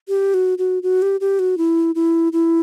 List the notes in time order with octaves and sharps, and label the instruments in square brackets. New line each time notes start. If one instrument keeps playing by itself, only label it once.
[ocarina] G4
F#4
F#4
F#4
G4
G4
F#4
E4
E4
E4